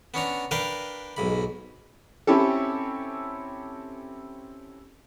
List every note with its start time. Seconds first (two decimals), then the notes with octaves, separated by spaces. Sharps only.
0.14 B3 C#4 D4 A#5
0.51 D4 A#4 B4 F5 G5
1.17 B1 G#2 B5
2.27 C4 C#4 E4 G4 A4